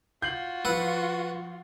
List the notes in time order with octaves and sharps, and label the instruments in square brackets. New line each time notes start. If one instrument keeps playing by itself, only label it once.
[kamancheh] F4 F#4 [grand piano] G6 C7 F#7
[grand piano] F3 E6 [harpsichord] B4 F#5